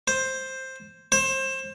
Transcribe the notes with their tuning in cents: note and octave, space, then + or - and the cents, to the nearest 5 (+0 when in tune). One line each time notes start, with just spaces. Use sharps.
C5 +5
C5 +25